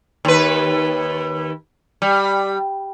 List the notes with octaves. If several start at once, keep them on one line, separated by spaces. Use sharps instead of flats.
D#2 B4
G3